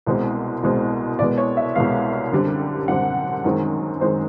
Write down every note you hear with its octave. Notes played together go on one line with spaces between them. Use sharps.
C2 B2 G#3 C4
C2 B2 G#3 C4
C2 B2 G#3 B3 D5
C#5
E5
C2 B2 G#3 B3 F5
F#2 D3 G3 C4
F#2 D3 G3 C4 F#5
F#2 D#3 G#3 C4
D#3 G#3 C4 C5